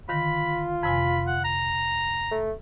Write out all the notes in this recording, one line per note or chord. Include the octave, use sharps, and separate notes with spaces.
D3 D#3 F4 B5 A#6
F2 C3 G#5 B5
F#5
A#5
A3